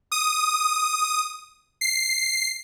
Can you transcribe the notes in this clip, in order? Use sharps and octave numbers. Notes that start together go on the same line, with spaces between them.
D#6
C7